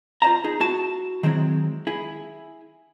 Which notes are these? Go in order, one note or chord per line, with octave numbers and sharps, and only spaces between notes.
F4 C5 D5 E5 A#5
D#4 G#4
E4 F#4 A5
D#3 F#3 G#3 C4 E4
E4 G#4